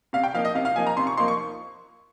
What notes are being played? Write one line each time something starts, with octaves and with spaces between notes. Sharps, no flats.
C3 F5
G5
F3 A#3 D#4 F5
D#5
C3 F5
F5
F3 A#3 D#4 G#5
A#5
C3 C6
C#6
F3 A#3 D#4 C6
C#6